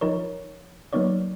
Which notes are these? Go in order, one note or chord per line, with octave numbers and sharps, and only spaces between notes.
F3 D#4 A#4 C#5
F#3 A#3 B3 D#4 C#5 D5